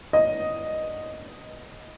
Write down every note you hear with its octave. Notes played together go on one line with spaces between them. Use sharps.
D#5